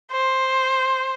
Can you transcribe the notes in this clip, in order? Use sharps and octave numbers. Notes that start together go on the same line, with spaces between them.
C5